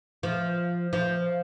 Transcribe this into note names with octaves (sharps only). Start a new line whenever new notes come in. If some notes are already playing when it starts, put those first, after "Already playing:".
F3
F3